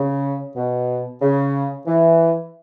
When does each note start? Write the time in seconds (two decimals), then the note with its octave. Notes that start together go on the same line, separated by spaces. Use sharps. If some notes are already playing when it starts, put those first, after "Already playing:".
Already playing: C#3
0.56 B2
1.21 C#3
1.86 E3